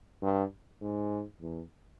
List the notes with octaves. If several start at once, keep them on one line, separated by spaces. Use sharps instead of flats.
G2
G#2
E2